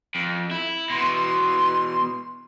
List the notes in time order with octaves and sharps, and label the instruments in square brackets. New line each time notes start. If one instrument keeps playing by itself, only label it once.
[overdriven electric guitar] F2
E4
[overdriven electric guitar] B2 E3 [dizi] C6